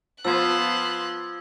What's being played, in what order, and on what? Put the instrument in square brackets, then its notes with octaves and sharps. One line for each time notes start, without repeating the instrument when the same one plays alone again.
[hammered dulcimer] F3 [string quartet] B3 C5 F5 [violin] C6 F#6 [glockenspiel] E6 G#6